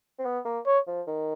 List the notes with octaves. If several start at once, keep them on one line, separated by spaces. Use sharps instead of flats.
C4
B3
A#3
C#5
F3
D#3